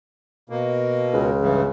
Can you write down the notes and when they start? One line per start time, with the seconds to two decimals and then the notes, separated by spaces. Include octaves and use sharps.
0.50 B2 A#3
1.13 C#2
1.40 G2 C#3 E3